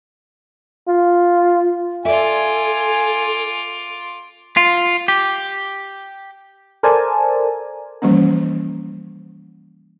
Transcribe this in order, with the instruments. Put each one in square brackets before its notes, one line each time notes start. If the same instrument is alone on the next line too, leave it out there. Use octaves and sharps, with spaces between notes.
[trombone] F4
[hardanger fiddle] F4 D6 [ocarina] A4 [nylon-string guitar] D5 E5 [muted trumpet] G#5
[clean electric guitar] F4
G4
[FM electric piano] A4 A#4 C5 D5 G#5 A5
[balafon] E3 F3 G3 A#3 C#4